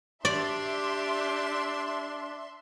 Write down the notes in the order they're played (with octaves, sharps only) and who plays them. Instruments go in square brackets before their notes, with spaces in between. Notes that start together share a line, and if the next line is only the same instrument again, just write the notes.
[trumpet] D4 [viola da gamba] G4 [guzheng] D5 [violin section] E5 C6